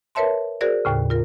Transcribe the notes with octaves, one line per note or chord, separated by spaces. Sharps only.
A#4 B4 C#5 E5 A5 C6
F#4 G#4 A#4 C5 D5
D#2 A2 C#3
F4 A#4